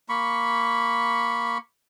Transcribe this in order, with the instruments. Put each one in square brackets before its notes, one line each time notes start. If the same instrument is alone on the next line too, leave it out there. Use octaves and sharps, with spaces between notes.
[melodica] A#3 B5 C#6